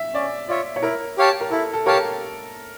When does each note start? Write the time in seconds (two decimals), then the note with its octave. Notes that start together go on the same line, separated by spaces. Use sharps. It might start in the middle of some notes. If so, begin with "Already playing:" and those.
Already playing: E5
0.13 C#4 D5
0.49 F4 C#5 D5 E5
0.76 C#5
0.82 E4 A#4
1.18 G4 C#5 F5 A5
1.41 A#4
1.51 E4 A4
1.73 A4
1.86 G4 A#4 C#5 F5 A5